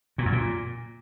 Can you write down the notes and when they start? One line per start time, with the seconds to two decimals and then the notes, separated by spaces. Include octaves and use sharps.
0.18 A#2
0.25 F#2
0.32 A#2